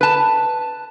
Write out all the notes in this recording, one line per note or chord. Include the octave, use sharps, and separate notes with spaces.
B4 A5